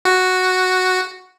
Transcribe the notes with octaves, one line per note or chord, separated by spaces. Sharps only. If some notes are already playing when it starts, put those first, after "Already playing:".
F#4